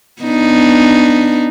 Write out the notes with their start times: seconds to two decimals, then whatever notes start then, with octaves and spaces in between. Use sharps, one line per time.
0.22 B3 D4 D#4